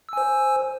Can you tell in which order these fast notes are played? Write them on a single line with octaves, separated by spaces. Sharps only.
E6 G#5 C5